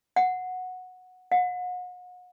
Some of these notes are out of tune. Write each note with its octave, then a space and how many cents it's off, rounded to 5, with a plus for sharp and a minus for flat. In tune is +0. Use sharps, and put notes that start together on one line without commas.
F#5 -10
F#5 -40